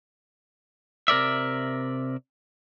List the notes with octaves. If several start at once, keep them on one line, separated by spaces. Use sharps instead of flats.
C3 A#4 D5 E5